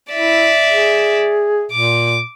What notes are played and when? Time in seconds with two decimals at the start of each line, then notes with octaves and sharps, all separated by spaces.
0.12 E4 D5 E5
0.69 G#4
1.72 A#2 D6